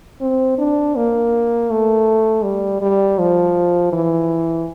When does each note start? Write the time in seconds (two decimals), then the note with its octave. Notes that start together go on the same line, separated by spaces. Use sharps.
0.21 C4
0.58 D4
0.96 A#3
1.71 A3
2.44 G3
2.82 G3
3.19 F3
3.93 E3